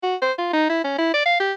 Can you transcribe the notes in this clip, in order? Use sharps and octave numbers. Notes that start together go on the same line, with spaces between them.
F#4
C5
F4
D#4
E4
C#4
E4
D5
F5
G4